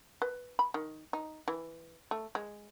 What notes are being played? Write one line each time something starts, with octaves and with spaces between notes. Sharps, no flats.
B4
B5
D#3
D#4
E3
A3
G#3